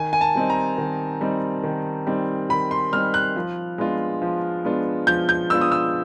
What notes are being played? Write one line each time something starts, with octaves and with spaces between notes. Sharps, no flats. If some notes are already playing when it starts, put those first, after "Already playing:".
Already playing: D#3 G#5
G#5
A5
G3 C4 D#4
A#5
D#3
G3 C4 D#4
D#3
G3 C4 D#4
D#3 B5
C6
G3 C4 D#4 F6
F#6
F3
G#3 B3 D4 F4
F3
G#3 B3 D4 F4
F3 G6
G6
G#3 B3 D4 F4 E6
D#6
E6